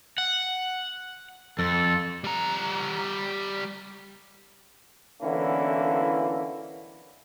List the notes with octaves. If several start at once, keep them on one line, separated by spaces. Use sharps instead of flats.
F#5
F2 A4
G3 A#5
B1 D3 E3 A#3 C#4 E4